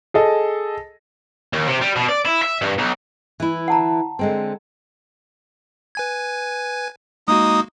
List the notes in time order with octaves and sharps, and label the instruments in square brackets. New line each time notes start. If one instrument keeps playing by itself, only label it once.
[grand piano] G#4 A4 D#5
[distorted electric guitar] D#2
C3
G3
B2
D5
E4
E5
G2
B1
[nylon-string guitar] E3 E4
[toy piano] F#5 A5 A#5
[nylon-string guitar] D3 G#3 C4
[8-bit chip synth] B4 G#5 G#6
[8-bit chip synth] G#3 A#3 F#4 [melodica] D#4 D#6